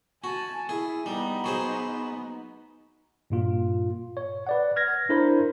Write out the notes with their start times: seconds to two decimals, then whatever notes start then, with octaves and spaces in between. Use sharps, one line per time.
0.24 F#4 G#5 A5
0.69 E4 G#4
1.06 G3 B3 D#4
1.44 F#3 G#4 C5
3.30 G2 A#2 F4
4.17 C#5
4.47 B4 D5 F#5
4.76 F6 G#6 A#6
5.09 D4 E4 A#4 C5 B5